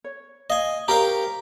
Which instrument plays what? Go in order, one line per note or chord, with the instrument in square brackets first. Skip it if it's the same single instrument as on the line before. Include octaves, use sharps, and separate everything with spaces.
[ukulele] C#5
[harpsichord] D#5 G#5 [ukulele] F5
[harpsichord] G4 A#4 F5 [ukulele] C5 C#5 A#5